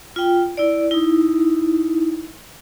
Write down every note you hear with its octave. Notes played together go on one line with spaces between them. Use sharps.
F4 G5
E4 D5
D#4 E4